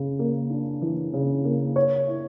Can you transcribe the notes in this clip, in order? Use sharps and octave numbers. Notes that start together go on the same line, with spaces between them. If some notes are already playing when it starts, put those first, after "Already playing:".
Already playing: C#3
A#3
D4
E3
C#3
A#3
C#5
E4